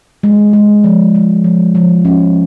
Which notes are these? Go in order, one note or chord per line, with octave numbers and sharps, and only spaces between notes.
G#3
G#3
F3
G#3
F3
F3
C#4